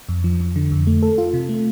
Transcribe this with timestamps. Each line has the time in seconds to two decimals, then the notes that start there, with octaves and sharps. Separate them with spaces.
0.09 F2
0.24 F3
0.40 F2
0.56 D3
0.72 F2
0.87 A3
1.02 A4
1.18 F4
1.34 C3
1.49 A3